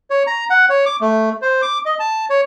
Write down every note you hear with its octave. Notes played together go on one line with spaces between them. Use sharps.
C#5
A#5
F#5
C#5
D6
A3
C5
D6
D#5
A5
C#5